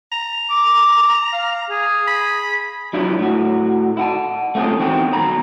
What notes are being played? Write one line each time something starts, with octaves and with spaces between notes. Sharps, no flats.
A#5
D6
F5
G#4
B5
F#3 D4 E4 F4
A2 F#4
E4 F#5 A5
A3 A#3 C4 C#4 F4 G#4
E2 D#3 C4 F#4 G5
D#2 B2 A#5 B5